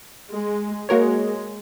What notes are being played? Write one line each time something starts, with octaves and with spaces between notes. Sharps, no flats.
G#3
G#3 A#3 F#4 A#4 C#5